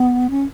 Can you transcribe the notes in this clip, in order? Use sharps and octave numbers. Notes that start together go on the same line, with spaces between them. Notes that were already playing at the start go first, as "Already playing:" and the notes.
Already playing: B3
C#4